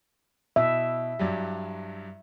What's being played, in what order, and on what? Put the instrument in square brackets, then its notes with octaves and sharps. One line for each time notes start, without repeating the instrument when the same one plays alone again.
[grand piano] B2 [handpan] E5
[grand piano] G2 F#3 G3